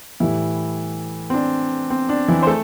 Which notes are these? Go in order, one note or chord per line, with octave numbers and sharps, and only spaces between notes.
A2 E3 G3 E4
C4
D4
C4
D4
E3 E4
C5
A3 A4